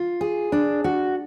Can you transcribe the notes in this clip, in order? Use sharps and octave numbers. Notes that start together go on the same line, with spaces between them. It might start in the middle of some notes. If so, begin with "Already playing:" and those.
Already playing: F4
G#4
D4
F#4